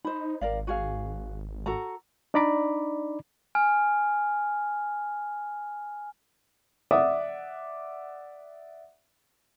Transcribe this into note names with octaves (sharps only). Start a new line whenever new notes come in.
D#4 C5 B5
G#1 A#4 D5 F5
F#4 G#4 F5
F#4 A4 A#5
D4 D#4 D5 A#5 B5 D6
G#5 F6
D5 E5 F#5 D6 D#6